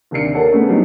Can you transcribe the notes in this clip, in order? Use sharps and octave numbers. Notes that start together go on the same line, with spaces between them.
D#2 C3 D4 C7 C#7
A4 A#4 C#5 F#5 A5
A3 B3 C#4 G#4 B4
F#3 G3 B3 D#4 E4 G4